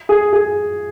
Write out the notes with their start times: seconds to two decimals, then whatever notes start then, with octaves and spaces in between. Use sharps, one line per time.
0.09 G#4
0.33 G#4